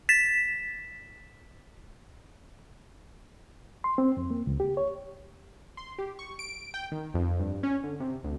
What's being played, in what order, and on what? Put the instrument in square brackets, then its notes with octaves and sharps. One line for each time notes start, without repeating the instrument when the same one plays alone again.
[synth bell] A6 B6 E7
[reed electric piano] C6
C4
F2
A#3
C#2
G4
C#5
[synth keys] C6
G4
C#6
D7
G5
D#3
F2
G2
C#4
D3
C3
D2